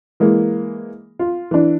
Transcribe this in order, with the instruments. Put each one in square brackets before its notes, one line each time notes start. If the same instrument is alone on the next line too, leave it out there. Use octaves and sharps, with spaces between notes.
[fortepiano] E3 G#3 A#3
F4
E3 D4